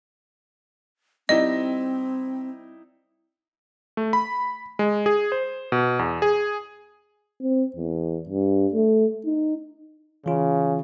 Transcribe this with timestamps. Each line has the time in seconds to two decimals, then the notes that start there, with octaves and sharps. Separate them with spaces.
1.29 G3 C4 D#4 E4 D#5
3.97 A3
4.13 B5
4.79 G#3
5.06 G#4
5.32 C5
5.72 B2
5.99 E2
6.22 G#4
7.42 C4
7.76 E2
8.29 G2
8.74 A3
9.25 D#4
10.26 C#3 E3 F4